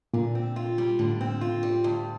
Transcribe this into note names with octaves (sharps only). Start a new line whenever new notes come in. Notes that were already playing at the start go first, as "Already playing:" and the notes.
A#2 D3
C4
F4
G3
A2 D3
C4
F4
G3
D2